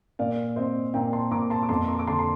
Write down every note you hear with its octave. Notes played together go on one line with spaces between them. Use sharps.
A#2 D5 F5
C4 C5 D#5
A#2 G5 A#5
A5 C6
A#2 A#5 D6
A5 C6
D6
F2 A5 C6
A#5 D6
D6
D3 A5 C6
C6